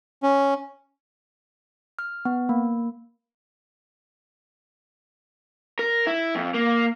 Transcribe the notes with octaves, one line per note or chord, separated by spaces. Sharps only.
C#4
F6
B3
A#3
A#4
E4
F2
A#3